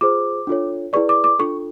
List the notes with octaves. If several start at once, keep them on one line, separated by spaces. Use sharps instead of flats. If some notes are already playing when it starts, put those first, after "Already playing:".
F4 G#4 C5 D6
D4 F4 A4 C#5
E4 G#4 B4 D5 C#6
D6
D6
D4 F4 A4 C#6